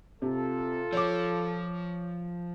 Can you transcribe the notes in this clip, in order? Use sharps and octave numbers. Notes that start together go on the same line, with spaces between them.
C3 F4 A4
F3 C#5 D6